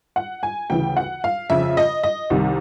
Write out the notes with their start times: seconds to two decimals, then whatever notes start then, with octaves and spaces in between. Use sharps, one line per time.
0.16 F#5
0.43 G#5
0.70 D2 C#3 E3 G5
0.97 F#5
1.24 F5
1.50 F2 C#3 F3 E5
1.77 D#5
2.03 D#5
2.30 C2 C3 D#3